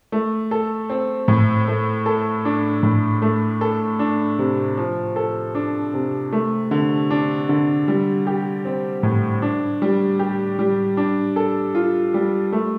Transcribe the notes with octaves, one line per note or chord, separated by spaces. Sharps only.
A3
A4
C4
A2
A3
A4
D4
A2
A3
A4
D4
C3
F3
A4
D4
C3
A3
D3
D4
D3
G3
G4
C4
A2
D4
G3
G4
G3
D4
A4
F4
G3
A3